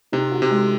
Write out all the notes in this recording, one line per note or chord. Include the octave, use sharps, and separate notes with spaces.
C3 D#4
F#4
C3
G#3